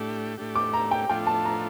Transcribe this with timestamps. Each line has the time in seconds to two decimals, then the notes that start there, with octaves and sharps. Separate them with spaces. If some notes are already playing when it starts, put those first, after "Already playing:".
Already playing: A2 A3 D4 G4
0.37 A2 A3 D4 G4
0.55 D6
0.73 A#5
0.91 G5
1.09 A2 F3 A3 D4 F4 G5
1.27 A5
1.45 A#5